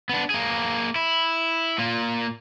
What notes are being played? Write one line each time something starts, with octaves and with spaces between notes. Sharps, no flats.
B3 D4
A#3 G#4
E4
A#2 A#3